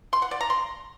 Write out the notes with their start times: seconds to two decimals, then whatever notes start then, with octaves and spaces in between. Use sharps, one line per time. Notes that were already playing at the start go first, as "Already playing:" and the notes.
0.13 C6
0.22 F#5
0.31 D5
0.41 A#5
0.50 C6